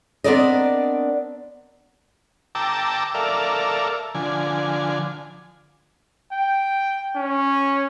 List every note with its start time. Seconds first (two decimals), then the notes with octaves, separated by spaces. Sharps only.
0.24 B3 C4 D4 A#4 D5 D#5
2.55 G5 A5 A#5 D6 E6
3.14 A4 A#4 D5 E5 F5
4.15 D3 F3 G#5
6.32 G5
7.16 C#4